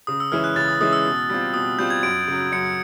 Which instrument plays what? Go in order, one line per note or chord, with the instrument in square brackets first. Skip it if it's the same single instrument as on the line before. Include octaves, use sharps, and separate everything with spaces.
[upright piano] C#3 [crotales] D#6
[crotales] E6
[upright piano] E3 G#3 C#4 E4 [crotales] F6
[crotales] F#6
[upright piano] C#3 [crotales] A6
[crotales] D#6
[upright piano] E3 G#3 C#4 E4 [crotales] D#6
[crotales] E6
[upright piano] B2
G3 C4 F4
[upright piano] B2 [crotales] D#6
[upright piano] G3 C4 F4 [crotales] G6
[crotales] G#6
[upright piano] F#2 [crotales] D7
[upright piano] C#3 F#3
[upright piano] F#2 [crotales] C#7